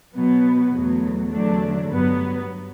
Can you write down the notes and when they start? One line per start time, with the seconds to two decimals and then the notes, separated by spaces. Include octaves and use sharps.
0.14 B2 F#3 B3
0.73 E2 B2 F#3 A3
1.31 E2 D3 F#3 A3 D4
1.89 G2 F#3 B3